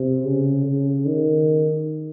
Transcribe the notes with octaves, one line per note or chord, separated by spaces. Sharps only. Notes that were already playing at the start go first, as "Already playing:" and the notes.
Already playing: C3
C#3
C#3
D#3